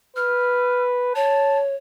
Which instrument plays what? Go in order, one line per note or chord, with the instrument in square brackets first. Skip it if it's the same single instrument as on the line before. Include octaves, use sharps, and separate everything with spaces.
[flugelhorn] B4 [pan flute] F6
[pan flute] C#5 [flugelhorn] A5